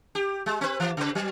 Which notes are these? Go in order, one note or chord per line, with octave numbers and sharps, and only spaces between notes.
G4
G#3
C4 B4
E3
C#3 B4
F#3